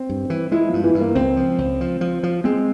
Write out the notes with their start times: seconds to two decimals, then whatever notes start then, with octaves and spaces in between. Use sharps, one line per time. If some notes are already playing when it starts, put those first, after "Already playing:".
Already playing: C4
0.10 G2
0.30 E3
0.52 G#3 E4
0.68 G2 F3
0.84 E3
0.94 G2
1.00 A#3
1.15 C#2 C4
1.37 F3
1.58 C#2
1.81 F3
2.01 F3
2.23 F3
2.44 G#3 C4